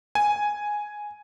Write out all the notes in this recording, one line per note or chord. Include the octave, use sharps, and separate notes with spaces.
G#5